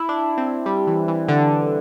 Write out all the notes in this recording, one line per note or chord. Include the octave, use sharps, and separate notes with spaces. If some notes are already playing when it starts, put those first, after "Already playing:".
Already playing: E4
D4
C4
G3
E3
E3
D3